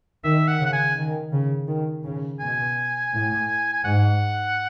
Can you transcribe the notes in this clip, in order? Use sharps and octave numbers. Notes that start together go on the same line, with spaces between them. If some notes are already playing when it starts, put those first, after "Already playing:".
D#3 E5
F#5
C#3
F#5
G#5
D#3
C#3
D#3
C#3
B2 G#5
A2
G#5
G#2 F#5